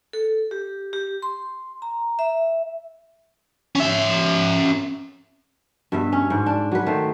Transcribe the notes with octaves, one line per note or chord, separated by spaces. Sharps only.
A4
G4
G4
C6
A#5
E5
C#4 E5
G2 B2 E5
C#4
G#2
D4
F#3 B4
D#3 A3 C5